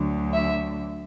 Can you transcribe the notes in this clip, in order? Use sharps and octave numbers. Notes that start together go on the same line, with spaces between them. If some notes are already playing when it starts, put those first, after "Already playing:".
Already playing: D2 D3 F#3
E5